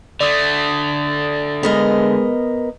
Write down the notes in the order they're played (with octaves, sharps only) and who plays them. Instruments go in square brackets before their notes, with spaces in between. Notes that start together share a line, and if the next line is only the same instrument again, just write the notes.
[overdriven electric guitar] D3 A3 [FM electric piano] D5 D#6
[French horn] G#3 [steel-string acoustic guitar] B3 A#4 D#5